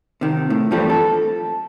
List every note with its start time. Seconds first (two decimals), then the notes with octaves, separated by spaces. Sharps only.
0.21 C3 D#3
0.50 A2
0.71 G2 E3 F3 G3 A3 C4
0.90 A4